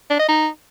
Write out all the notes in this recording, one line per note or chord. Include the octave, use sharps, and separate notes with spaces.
D4
D#5
D#4